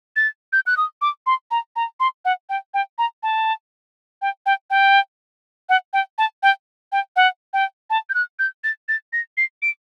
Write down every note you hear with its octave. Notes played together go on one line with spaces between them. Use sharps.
A6
G6
F#6
D#6
D6
C6
A#5
A#5
C6
F#5
G5
G5
A#5
A5
G5
G5
G5
F#5
G5
A5
G5
G5
F#5
G5
A5
G6
F#6
G6
A6
A6
A#6
C7
D7